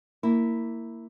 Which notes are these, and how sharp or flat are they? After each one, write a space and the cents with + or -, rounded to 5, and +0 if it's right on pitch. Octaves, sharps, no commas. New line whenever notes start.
A#3 -15 E4 +0